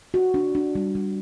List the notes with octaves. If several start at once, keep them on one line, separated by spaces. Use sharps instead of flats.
F#4
D4
D4
G3
G3